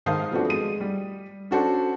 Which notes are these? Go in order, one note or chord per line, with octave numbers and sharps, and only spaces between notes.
G#2 D#3 C5 F5 A5 D#6
F3 A3 B3 C4 D4 F#4
G#3 D#7
G3
C#4 D4 F#4 A4 C5